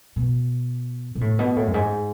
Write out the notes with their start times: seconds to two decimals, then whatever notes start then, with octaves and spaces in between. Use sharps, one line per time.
0.16 B2
1.15 B2
1.21 A2
1.39 B2
1.56 A2
1.67 F#2
1.74 G#2